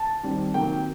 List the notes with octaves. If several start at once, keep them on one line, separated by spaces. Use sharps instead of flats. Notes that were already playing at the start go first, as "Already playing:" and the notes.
Already playing: A5
D#3 G3 C4
C3 D#3 F#3 A#3 G5